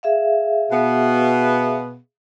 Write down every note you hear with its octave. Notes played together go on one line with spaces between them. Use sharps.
G#4 E5 F5
B2 B3